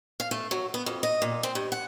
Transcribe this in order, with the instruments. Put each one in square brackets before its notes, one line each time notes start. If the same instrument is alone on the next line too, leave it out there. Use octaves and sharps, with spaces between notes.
[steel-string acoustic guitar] F5
A3
F#3
B3
F2
D#5
A#2
C4
G2
F#5